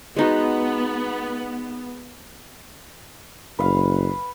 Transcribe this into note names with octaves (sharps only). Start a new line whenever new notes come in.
G#3 B3 D#4 F#4
F#1 B4 F5